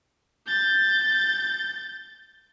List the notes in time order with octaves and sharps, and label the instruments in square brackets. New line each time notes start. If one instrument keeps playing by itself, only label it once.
[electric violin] G6 A6